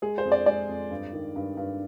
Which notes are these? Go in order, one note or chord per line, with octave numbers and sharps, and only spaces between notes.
G#3 G#4
C5
F2
D5
G#3 D5
F2
G2
D#3
G2
G2